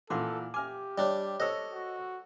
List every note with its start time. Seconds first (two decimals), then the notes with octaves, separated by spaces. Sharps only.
0.10 A#2 E3 A4 F#5 C6 D6
0.54 G4 E5 G#5 D6 F6
0.98 G3 D4 C#5 D#5
1.40 A4 C5 C#5 D#5 E6
1.73 F#4